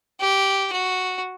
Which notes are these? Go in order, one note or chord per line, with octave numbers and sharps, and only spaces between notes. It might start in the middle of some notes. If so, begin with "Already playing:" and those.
G4
F#4